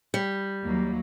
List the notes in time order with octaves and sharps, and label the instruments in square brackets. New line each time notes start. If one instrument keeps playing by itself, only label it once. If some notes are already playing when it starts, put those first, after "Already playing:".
[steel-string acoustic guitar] G3
[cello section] D#2 F#3 A#3